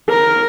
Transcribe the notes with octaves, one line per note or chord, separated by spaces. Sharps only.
A#4